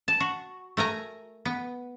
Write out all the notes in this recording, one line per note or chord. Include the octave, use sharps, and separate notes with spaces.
A5
F#4
A3 A#4 G#5 A#5
B3